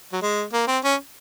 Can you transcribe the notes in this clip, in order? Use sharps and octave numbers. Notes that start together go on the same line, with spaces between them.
F#3
G#3
A#3
C4
C#4